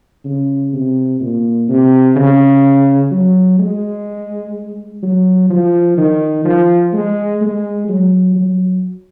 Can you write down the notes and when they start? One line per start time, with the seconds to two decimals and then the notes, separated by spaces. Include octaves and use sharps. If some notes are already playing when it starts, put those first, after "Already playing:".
0.25 C#3
0.73 C3
1.20 A#2
1.68 C3
2.16 C#3
3.11 F#3
3.59 G#3
5.03 F#3
5.50 F3
5.97 D#3
6.45 F3
6.93 G#3
7.41 G#3
7.89 F#3
8.36 F#3